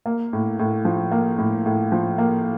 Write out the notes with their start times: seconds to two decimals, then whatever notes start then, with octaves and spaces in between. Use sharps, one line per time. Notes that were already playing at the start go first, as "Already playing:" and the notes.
0.06 A#3
0.33 A2
0.59 A2
0.85 F3
1.11 A#3
1.38 A2
1.66 A2
1.92 F3
2.18 A#3